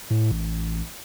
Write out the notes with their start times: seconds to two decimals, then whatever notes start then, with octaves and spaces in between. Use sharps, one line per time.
0.10 A2
0.31 A1